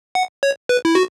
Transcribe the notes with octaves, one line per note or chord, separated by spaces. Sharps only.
F#5
C#5
B4
E4
F#4